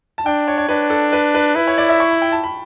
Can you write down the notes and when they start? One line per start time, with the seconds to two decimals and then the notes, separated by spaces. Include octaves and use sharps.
0.18 A5
0.26 D4 G5
0.48 C#5
0.58 C#5
0.69 D4 B4
0.90 A4
1.13 B4
1.35 B4
1.55 E4 B4
1.68 C#5
1.78 D5
1.89 E5
2.00 C#6
2.11 B5
2.22 G5
2.32 A5
2.44 B5